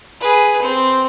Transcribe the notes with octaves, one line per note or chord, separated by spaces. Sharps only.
G#4 B4
C4